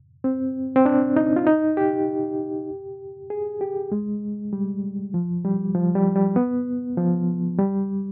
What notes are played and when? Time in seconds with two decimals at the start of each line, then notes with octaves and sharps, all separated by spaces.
0.24 C4
0.76 C4
0.86 D4
1.16 D#4
1.36 F4
1.47 D#4
1.77 G4
3.30 G#4
3.61 G4
3.92 G#3
4.53 G3
5.14 F3
5.45 G3
5.75 F3
5.95 G3
6.15 G3
6.36 B3
6.97 F3
7.59 G3